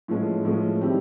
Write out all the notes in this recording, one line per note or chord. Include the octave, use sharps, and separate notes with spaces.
A2 F3 G#3 C#4
A2 F3 G#3 C#4
D#3 G3 C4 E4